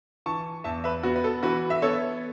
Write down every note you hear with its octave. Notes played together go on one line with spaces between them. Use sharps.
E3 A5 C#6
E2 E5 A5
B4 E5
B3 F#4
B4
A4
E3 F#4 B4
E5
B3 A4 C#5